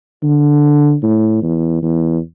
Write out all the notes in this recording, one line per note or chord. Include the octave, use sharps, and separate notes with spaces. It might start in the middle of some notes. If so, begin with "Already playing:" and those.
D3
A2
E2
E2